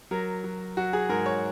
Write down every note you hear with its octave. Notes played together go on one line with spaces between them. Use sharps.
F#3 A#4
F#3
F#3 F#4
G#4
G#2 A#4
C#5